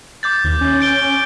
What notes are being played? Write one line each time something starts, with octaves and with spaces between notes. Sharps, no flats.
D6 G6 A6
D#2
C#4
G6 D7 G7